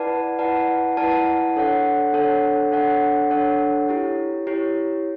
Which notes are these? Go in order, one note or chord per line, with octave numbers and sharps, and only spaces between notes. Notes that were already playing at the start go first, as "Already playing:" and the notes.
Already playing: E4 B4 D5 F#5 A5
E4 B4 D5 F#5 A5
E4 B4 D5 F#5 A5
D4 A4 C#5 F#5
D4 A4 C#5 F#5
D4 A4 C#5 F#5
D4 A4 C#5 F#5
E4 G4 C#5
E4 G4 C#5